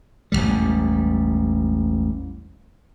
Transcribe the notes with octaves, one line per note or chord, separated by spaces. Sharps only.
E1 A1 D#2 G3